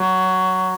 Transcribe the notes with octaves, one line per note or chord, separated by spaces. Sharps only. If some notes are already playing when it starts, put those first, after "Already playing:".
Already playing: F#3